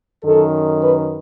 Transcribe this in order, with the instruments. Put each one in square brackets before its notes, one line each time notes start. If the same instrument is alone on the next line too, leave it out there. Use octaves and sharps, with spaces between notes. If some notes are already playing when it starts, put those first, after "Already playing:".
[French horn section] F#2 D#3 A4
B4